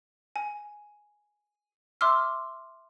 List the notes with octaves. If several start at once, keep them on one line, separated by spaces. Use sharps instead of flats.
G#5
E5 C6 D6 E6 F6